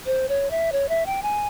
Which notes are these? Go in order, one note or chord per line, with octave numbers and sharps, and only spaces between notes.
C5
C#5
E5
C#5
E5
G5
G#5